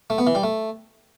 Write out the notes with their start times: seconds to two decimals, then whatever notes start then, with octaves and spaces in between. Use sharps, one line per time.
0.10 A3
0.18 B3
0.27 E3
0.35 G3
0.43 A3